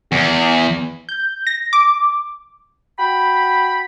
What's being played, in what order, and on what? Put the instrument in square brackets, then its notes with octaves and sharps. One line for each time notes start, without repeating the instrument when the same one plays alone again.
[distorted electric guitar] E2
[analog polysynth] G6
A#6
D6
[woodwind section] F#4 G5 B5